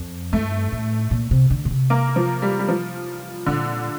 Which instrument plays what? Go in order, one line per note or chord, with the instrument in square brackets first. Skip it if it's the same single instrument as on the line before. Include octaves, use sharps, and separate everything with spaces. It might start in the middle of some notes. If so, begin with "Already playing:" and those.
Already playing: [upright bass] F2
[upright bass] G2 [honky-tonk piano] A3
[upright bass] A2
A#2
C3
D3
A#2
C3
[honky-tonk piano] A#3
F3
G3
G3
F3
[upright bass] A#2 [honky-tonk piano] D3